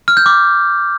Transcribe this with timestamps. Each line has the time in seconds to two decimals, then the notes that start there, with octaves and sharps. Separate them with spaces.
0.08 F6
0.17 G6
0.26 D6